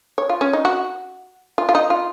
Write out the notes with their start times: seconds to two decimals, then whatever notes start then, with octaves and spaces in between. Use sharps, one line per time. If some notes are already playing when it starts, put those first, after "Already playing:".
0.18 C#5
0.29 F4
0.41 C#4
0.53 D#4
0.65 F#4
1.58 F4
1.69 F4
1.75 D#4
1.90 F4